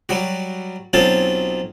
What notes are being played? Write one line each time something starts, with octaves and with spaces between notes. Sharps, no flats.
F#3 G3 F#4
B1 F#3 C4 C#4 F4 A5